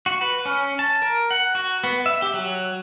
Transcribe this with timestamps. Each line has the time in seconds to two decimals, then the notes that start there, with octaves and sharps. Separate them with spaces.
0.06 F#4
0.21 B4
0.45 C#4
0.79 A5
1.02 A#4
1.31 F#5
1.55 F#4
1.84 B3
2.06 E5
2.22 G4
2.34 F#3